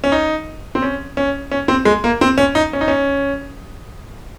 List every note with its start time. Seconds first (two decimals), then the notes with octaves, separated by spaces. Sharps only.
0.04 C#4
0.12 D#4
0.75 C4
0.82 C#4
1.17 C#4
1.51 C#4
1.68 C4
1.85 G#3
2.04 A#3
2.21 C4
2.38 C#4
2.55 D#4
2.73 C#4
2.81 D#4
2.88 C#4